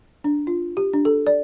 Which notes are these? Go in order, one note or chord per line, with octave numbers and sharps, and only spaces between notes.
D4
F4
G4
D4
A4
D5